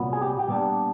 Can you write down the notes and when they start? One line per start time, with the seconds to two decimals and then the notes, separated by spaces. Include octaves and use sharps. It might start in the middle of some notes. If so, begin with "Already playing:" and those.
Already playing: C2 A#2 F#3 B3
0.13 G#4
0.21 G4
0.39 G4
0.48 A#2 G3 B3 D4